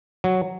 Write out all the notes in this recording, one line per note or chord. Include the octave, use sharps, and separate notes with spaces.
F#3